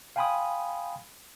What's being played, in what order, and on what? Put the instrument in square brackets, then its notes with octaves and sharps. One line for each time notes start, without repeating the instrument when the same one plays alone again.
[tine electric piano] F5 G5 G#5 B5 C6 D#6